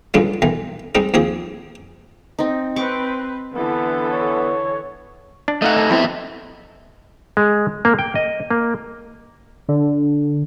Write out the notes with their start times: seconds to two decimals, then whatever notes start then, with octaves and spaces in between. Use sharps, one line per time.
0.14 C#2 G2 D3 F#3 G#3
0.42 B1 D#3 E3
0.95 G3 G#3 C4 D#4
1.14 D#2 F3 C4 G#4
2.39 C4 D#4
2.76 C4 B4 C#6 D6
3.55 D3 E3 B3 A4
4.08 C#5
5.48 D4
5.62 A3 D#4 D#5 F5 F#5
5.78 A4
5.90 F2 B3 C4 E4 A4 E5
7.37 G#3
7.85 A#3
7.99 G5
8.15 D#5
8.51 A#3
9.68 D3